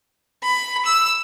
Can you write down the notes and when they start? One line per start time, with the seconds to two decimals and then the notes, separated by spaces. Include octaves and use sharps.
0.43 B5
0.85 E6